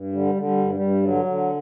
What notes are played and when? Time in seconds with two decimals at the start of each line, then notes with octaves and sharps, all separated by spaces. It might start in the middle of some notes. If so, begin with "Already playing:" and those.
Already playing: G2
0.12 D3 G3
0.35 D3
0.42 G3
0.57 G2
0.73 G3
0.80 G2
1.03 D3 F#3
1.25 D3